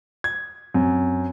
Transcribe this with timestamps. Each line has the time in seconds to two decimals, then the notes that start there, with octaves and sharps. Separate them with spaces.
0.24 G#6
0.74 F#2 C4